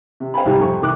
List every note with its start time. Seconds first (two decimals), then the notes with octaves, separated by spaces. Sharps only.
0.20 C3
0.34 C5 F5 G5 G#5 B5
0.45 C2 G#2 G3 G#5 A#5
0.59 F2 C3 C4 C#6
0.82 C2 D#3 A#4 D6 F#6